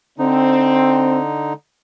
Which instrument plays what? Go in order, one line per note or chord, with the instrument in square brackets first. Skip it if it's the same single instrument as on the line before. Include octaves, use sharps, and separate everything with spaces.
[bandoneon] D3 D#4 [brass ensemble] C4